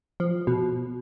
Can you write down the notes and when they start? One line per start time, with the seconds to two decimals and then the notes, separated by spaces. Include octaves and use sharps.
0.20 F3
0.47 B2